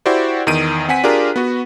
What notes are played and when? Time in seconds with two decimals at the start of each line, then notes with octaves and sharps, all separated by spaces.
0.06 E4 F#4 G4 C5 D5
0.47 E2 D#3 D7 D#7
0.88 C4 F#5 G#5 B6 D#7
1.04 D4 F4 G4 G#4 A#4
1.36 B3 F#4